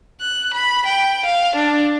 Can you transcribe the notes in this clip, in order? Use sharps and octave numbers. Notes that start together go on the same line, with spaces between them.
F#6
B5
G5
F5
D4